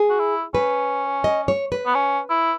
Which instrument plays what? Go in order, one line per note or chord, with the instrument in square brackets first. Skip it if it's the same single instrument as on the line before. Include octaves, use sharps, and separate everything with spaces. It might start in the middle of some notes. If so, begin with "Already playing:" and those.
Already playing: [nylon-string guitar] G#4
[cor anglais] F#4
E4
[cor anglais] C#4 [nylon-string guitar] B4
[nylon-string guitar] D#5
C#5
B4
[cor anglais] B3
C#4
E4